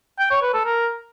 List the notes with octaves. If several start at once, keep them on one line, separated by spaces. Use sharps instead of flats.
G5
C#5
B4
A4
A#4